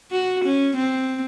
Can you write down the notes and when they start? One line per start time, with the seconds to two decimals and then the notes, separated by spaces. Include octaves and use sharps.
0.11 F#4
0.45 C#4
0.76 C4